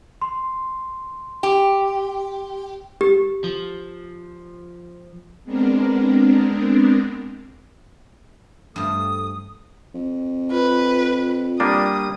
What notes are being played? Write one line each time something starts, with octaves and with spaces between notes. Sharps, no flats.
C6
G4
G4
F3
G#3 B3 C4 D4 A#4
G2 F3 A3 D#6
F2
F4 B4
G3 A#3 D4 D#6